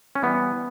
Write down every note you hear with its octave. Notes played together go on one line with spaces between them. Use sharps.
C#4
E3 G3 B3